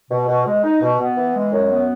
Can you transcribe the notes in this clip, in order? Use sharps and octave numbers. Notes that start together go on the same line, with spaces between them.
B2
B2
G#3
D#4
B2
B3
E3
G#3
F#2
B3